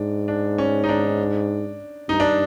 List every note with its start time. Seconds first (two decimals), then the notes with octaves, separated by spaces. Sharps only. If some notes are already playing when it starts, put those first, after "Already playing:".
Already playing: G#2 D4
0.28 D4
0.58 C#4
0.84 D#4
0.89 D4
2.09 G2 D#4
2.20 D4